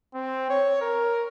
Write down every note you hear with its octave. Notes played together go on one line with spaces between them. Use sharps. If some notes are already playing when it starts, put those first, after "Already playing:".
C4
C#5
A#4